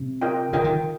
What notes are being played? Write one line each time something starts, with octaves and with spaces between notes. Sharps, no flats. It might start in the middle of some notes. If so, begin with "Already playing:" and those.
Already playing: C3
F4 A#4 D#5 G5
D3 F4 A#4 D#5 G5
D#3